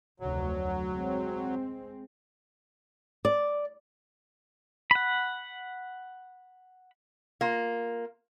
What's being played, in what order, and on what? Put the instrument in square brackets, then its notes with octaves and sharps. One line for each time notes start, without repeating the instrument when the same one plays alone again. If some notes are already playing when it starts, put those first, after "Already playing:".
[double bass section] F1 D2 [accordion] F#3
[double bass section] G#3 C4
[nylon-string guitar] D5
[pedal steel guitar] F#5 B5
[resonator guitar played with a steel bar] A#3 F4